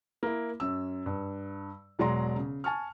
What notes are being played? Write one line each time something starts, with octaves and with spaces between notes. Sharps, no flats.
A#3 E4
F#2 C#4 E6
G2
E1 F#3 G#3 D5 A#5 C6
C#3
G#5 A5 C#6 F6